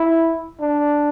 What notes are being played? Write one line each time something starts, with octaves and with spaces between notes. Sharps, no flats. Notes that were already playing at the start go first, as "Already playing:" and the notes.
Already playing: E4
D4